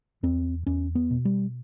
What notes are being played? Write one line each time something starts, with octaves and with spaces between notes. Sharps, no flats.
E2 C4
E2 C#4
B3
B2
G3